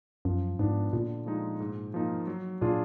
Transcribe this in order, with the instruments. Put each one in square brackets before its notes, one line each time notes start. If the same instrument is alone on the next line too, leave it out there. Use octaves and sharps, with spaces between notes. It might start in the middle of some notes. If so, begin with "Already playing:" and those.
[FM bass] F#2 [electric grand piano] F3
[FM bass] G#2 [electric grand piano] B3 D4 F4
[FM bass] A#2 [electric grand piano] D3
[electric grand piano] F3 G#3 D#4
G#2
F3 A#3 D#4
F#3
[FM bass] A#2 [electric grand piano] D4 F4 G#4